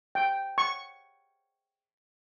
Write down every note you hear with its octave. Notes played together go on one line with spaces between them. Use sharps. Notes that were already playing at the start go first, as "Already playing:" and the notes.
G5
C#6